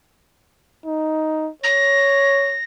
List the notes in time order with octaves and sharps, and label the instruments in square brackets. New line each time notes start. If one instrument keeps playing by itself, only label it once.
[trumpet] D#4
[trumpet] C#5 [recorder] A#6